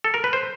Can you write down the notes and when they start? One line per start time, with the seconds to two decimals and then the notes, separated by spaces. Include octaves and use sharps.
0.04 A4
0.14 A#4
0.24 B4
0.33 C5